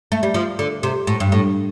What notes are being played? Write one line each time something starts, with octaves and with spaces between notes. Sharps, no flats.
A3
G3
F3
D3
C3
A2
G2
A2